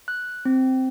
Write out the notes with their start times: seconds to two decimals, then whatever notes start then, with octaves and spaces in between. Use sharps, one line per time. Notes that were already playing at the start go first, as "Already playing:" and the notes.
0.08 F#6
0.45 C4